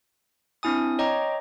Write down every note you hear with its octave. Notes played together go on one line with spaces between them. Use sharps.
C4 D4 E4 G#5 D#6
C#5 D#5 G5 A#5 D6